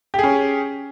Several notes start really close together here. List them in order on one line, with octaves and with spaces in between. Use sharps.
G4 G#4 C#4